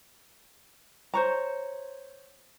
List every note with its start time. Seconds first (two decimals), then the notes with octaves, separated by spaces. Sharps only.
1.14 C5 C#5 A#5